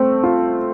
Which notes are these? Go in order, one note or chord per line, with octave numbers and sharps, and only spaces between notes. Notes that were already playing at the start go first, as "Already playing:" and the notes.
Already playing: A3 C4
F4